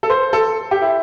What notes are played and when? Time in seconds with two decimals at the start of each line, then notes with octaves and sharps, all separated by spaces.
0.03 A4
0.10 C5
0.33 A4
0.71 G4
0.82 E4